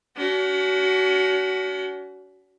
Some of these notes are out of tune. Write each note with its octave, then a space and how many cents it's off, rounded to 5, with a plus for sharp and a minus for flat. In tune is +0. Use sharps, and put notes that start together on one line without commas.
C#4 +45 F#4 +25